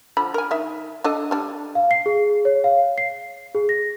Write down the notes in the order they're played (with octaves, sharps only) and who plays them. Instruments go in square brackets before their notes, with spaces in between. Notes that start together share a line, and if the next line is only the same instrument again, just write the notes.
[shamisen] D3 F3 B5
A#4 G#5
D#3 E5
D4 A4 D#5
G3 D4
[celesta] F5
C7
G#4
C#5
F5
C7
G#4
A#6